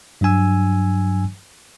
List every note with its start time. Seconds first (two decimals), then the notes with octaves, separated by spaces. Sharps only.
0.21 G2 F#3 D4 G#5 E6